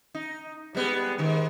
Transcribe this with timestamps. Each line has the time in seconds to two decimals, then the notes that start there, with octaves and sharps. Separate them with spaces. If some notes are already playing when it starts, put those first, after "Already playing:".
0.15 D#4
0.75 G3 G#3 B3
1.18 G#2 D#3